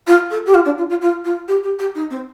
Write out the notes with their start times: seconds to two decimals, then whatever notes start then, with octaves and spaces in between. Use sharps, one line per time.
0.07 F4
0.31 A4
0.46 G4
0.54 F4
0.65 D4
0.78 F4
0.90 F4
1.01 F4
1.25 F4
1.48 G4
1.63 G4
1.79 G4
1.95 D#4
2.10 C4